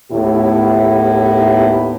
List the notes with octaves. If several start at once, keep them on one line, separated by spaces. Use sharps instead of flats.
D#2 A2 B3 E4 G4